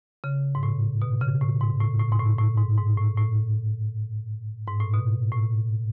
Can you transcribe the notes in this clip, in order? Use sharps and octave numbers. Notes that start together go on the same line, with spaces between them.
C#3
G#2
A2
B2
C#3
A2
G#2
A2
A2
G#2
A2
A2
G#2
G#2
A2
A2
G#2
A2
B2
A2